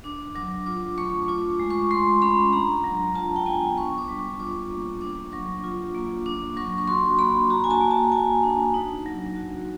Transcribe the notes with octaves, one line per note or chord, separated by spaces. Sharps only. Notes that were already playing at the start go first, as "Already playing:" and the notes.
D4 D6
F#3 D6
F4 D6
A3 C#6
F4 D6
G#3
C#6
G#3 C6
C#4 B5
D4 A#5
F#3
F4 A5
G5
B3 G#5
D4 C#6
D6
G3
C#6
F4 D6
A#3
D4 D6
F#3 C#6
F4
A#3
D4 D6
F#3 C#6
C#6
F#4 C6
A#3 B5
F#4 A#5
G#5
A5
A#3
A5
A#3 G#5
D4
D#4
F#3
F#4